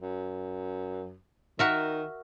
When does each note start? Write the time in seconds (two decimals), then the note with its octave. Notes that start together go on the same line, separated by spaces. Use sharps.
0.01 F#2
1.59 D#3 F#4 A#4 E5